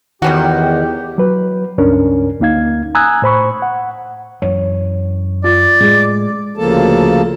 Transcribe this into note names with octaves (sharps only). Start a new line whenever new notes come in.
E2 D#3 G3 C#4 F#4 G4
F#3 B4
C#2 G2 C#4 D4 A#4
D2 A#3 D#4 F5 G#6
G#5 A#5 D#6 E6 F#6 G#6
A2 C5 B5 C#6
F#5
F#2 E3 C#5
F4 D5
A2 G#3
D2 C#3 F3 A#3 A4 A5